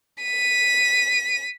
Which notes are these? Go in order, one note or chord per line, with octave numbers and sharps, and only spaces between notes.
B6 D#7